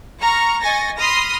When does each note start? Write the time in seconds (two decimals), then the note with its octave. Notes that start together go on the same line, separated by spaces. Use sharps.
0.21 A#5 C#6 F6
0.60 D#5 G#5 C#6 A6 A#6
0.97 B5 C6 D#6 F6 A#6